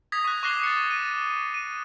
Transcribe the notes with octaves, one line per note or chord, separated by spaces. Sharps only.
D#6 G#6 A#6 B6
C#6 F#6
C#6 D6 F#6 A#6 C7 G7
A6 C#7
D#7
D#7